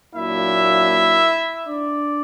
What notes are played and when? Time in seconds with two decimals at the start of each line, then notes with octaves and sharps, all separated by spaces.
0.15 A#2 F#3 A#3 D4 E4 E5
1.66 D4 D5